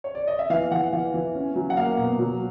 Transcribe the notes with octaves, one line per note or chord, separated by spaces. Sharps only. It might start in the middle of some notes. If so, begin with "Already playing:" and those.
C#5
D5
D#5
E5
E3 F5
E3 F#5
E3 F5
E3
C#4
F#3
F#5
A#3 F5
B2
F#3